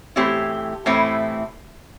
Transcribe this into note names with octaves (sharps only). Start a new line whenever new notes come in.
A2 E3 A3 C4 E4 G4
A2 E3 A3 C4 E4